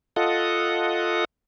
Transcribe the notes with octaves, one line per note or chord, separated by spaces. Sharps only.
F4 A4 D#5 F#5